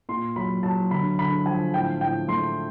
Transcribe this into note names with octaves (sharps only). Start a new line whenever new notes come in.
A#2 C6
F#3 B5
F#3 A5
D3 B5
D3 B5
F3 G#5
A2 G5
A2 G5
A3 C6